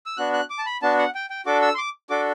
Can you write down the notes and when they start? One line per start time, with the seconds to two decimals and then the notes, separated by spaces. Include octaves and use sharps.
0.06 E6
0.17 B3 D4 F#4 F#6
0.33 F#6
0.50 D6
0.58 A5
0.66 B5
0.82 B3 D4 F#4 A5
0.99 F#5
1.15 G5
1.30 G5
1.46 D4 F#4 A4 D6
1.62 E6
1.75 C6
1.78 D6
2.10 D4 F#4 A4 D6